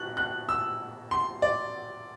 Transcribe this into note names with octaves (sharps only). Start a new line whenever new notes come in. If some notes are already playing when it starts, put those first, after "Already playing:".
Already playing: B2 F#6
F#6
E6
C6
D5